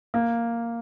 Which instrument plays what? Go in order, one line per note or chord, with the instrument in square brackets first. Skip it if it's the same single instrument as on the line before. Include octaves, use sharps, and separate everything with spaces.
[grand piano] A#3